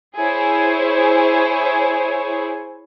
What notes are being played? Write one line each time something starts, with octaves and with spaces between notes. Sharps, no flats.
E4 G#4 C5 C#5